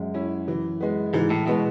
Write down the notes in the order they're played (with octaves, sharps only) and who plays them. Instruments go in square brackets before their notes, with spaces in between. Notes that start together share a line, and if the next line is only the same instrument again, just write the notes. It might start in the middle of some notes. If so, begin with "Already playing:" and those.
Already playing: [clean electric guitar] F#2 [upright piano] G#3
[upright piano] C#4 E4
E3
G#3 B3
[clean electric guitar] G#2 [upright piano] E3
[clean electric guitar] A2
[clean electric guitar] B2 [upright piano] G#3 B3